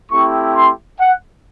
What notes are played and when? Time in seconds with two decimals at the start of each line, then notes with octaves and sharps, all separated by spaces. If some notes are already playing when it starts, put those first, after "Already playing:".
0.11 A3 C4 E4 G4 C#6
0.55 C6
1.00 F#5